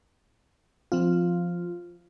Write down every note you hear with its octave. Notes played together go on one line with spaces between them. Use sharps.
F3 C4 F4